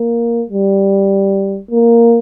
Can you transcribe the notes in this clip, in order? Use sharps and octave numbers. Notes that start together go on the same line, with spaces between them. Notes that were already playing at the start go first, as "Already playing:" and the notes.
Already playing: A#3
G3
A#3